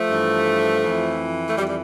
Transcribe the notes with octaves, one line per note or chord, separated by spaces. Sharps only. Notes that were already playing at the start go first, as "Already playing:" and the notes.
Already playing: F3 A3
G2 E3
F2 E3
A3
F2 E3 G3
G3